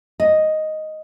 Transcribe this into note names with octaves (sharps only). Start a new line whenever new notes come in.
D#5